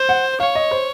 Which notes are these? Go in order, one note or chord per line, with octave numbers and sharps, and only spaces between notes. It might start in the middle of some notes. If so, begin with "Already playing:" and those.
Already playing: C5
F#5
C#5 F5
D#5
C5